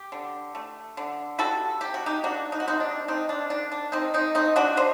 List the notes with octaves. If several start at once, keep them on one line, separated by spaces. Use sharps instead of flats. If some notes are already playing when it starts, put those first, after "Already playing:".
Already playing: G4
D3
A3
D3
G3 F#4 A4
C3 G4
F#4
D#4 G4
A#3 D4 F#4
D#4
F#4
C3 C4 D#4
D4
A3 C4 D#4
D4
D#3 D4
D4
D#3 C4 D#4
C4 D#4
A3 C4 D#4
D4 F#4
F#3 C5 D#5